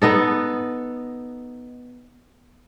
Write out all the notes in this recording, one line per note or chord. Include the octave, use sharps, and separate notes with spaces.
B3 D#4 A4